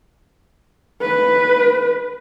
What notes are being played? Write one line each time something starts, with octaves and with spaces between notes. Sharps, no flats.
B4